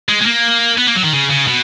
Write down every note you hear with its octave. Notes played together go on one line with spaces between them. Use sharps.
G#3
G#3
A#3
B3
A#3
F#3
D#3
C#3
C#3
B2